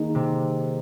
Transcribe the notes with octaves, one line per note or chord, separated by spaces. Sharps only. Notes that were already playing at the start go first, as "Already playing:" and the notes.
Already playing: D#3 G#3 A#3
C3